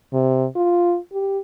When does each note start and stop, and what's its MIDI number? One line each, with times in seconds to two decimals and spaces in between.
0.13 0.46 48
0.56 0.97 65
1.13 1.39 67